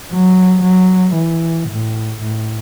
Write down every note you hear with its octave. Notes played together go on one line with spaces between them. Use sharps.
F#3
F#3
E3
A2
A2